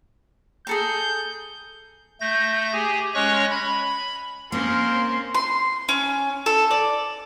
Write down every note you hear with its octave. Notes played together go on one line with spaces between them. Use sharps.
G#4 A4 A#5 G6
A3 G6 A#6
G4 G#4 G#5
G#3 C#4 C#5 C#6 F#6 A#6
B5
A#3 C4 C#4 A#4 C6
C6
C#4
A4
D5